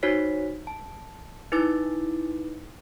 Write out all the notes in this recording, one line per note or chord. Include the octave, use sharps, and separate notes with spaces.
D#4 F#4 C5 C#5 B6
A5
D#4 E4 B4 D6 A6